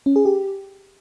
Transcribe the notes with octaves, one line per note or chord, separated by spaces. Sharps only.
C#4
G#4
G4